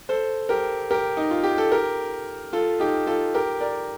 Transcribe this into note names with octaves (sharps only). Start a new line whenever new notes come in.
A4 C5
G4 A#4
G4 A#4
D#4
F4
G4
A4
G4 A#4
F4 A4
D#4 G4
F4 A4
G4 A#4
A#4 D5